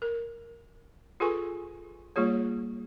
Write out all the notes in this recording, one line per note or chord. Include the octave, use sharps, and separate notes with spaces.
A#4
F4 G#4 A4 B4 G#5 C#6
G3 A#3 F4 G#4 C#5